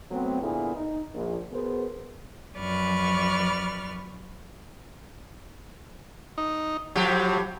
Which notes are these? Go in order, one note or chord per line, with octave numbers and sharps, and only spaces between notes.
F#3 A3 B3 C4
A#2 D3 B3 E4 G#4
D#4
A#1
B2 B3 G#4 A#4 C5
F#2 F3 B4 D5 C#6 F6
D#4
A2 F3 F#3 G4